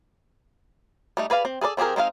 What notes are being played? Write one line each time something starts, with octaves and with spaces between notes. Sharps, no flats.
G3 A3 D#4
G#4 B4 D5 F5
C4
G#4 A4 B4 D5
F3 C4 G4 G#4 A#4
G#3 C4 D#4 F5